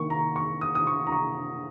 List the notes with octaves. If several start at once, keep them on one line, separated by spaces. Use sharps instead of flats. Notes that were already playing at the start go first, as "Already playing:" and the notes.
Already playing: D#3 A#3 C#6
A#5
C#6
D#6
D#6
C#6
A#5
C#6